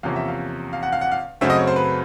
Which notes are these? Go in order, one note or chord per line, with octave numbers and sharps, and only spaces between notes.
E2 C3 F3 A#3 C#4 F5
E5
F5
F5
F#5
F5
F#5
F5
F#2 C#3 F#3 A3 C4 E5
D#5
C#5
C5
B4